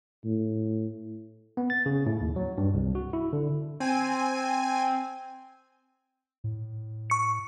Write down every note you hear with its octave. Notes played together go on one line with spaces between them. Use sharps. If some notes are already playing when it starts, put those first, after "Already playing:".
A2
B3
A6
C#3
A2
D#2
F#3
G2
C2
F#4
E4
D3
C4 G#5 D#7
A2
C#6 C#7